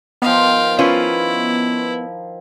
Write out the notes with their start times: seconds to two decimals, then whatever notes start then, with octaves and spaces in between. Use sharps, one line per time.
0.22 D#3 F3 B3 F5 G5
0.79 C#4 E4 F4 B4